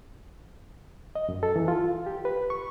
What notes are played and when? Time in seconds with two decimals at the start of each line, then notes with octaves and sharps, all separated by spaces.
1.15 D#5
1.29 F#2
1.43 A4
1.56 E3
1.68 F4
2.06 G4
2.25 B4
2.50 C#6